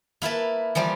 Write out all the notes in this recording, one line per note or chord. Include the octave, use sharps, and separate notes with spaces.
A#3 E4 B4 A5
E3 F3 G3 G4